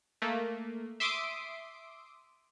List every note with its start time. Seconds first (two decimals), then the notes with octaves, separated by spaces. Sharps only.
0.22 A3 A#3
1.00 E5 C6 D6 D#6 C7 D7